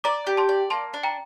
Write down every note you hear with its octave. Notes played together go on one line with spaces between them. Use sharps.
D5 A#5 D6
G4
A5 C6
D5
A#3 A5 C6
D4
G5 A#5